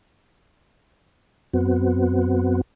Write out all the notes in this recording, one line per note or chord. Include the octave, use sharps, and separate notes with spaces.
F#2 B3 C4 F#4